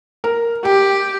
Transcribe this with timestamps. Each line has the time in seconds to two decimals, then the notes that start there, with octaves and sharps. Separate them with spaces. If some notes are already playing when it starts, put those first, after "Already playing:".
0.24 A#4
0.65 G4 G5